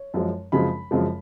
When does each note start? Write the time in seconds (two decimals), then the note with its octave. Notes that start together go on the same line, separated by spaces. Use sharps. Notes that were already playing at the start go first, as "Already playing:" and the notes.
Already playing: C#5
0.14 F#2 F3 G#3
0.52 F#2 C#3 F3 G#3 B5
0.91 F#2 C#3 F3 G#3